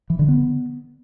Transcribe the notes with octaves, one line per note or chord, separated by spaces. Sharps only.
E3
D3
B3